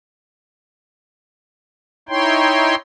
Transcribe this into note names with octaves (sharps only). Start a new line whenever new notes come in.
D#4 E4 C#5 G5 C6